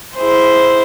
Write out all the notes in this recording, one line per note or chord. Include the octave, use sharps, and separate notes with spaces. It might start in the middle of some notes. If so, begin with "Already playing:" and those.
E4 G#4 C5